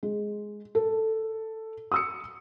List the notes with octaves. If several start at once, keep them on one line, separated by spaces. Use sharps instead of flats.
G#3
A4
D#6 E6 C#7